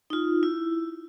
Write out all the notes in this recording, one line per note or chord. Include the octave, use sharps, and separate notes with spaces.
D#4 F4
E4